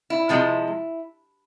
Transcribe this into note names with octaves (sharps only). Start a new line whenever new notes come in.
E4
C3 F3 G#3